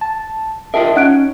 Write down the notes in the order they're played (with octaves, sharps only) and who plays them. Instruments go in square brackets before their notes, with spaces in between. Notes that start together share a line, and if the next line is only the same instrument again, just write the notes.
[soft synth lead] A5
[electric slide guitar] F4 G#4 A#4 [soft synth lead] D#5 [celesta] E5 G5 A5
[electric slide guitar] C#4 [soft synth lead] D#4 [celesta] F#5 F#6 D7